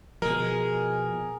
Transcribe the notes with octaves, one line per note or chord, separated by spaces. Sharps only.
B2 F3 G#3 A#4